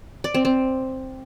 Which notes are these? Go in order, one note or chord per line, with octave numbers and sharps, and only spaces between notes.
D5
C4
C4